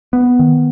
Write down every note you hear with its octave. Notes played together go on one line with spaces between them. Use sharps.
B3
D#3